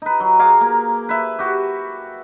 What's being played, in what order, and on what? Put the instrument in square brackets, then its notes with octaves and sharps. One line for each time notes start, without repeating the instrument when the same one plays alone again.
[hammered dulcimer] D#4 B4
F#3
G#4 F5 A#5 D6
A#3
B4 E5
F#4 G4